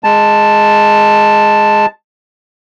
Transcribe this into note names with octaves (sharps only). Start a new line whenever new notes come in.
G#3 A5